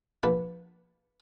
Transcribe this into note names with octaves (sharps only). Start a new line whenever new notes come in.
A#1 A#3 B4 F#5 A5